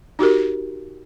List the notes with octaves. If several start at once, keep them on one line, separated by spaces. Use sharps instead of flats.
D#4 F#4 G4 A#4